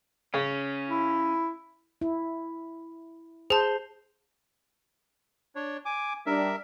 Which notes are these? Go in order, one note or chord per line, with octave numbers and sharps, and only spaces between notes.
C#3 C#4
E4
E4
G#4 C5 A5
D4 C#5
G#5 D6
G3 D4 A#4 E5